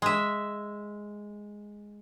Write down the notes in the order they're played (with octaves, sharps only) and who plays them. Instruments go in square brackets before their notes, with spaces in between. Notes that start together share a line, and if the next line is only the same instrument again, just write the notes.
[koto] G#3 E5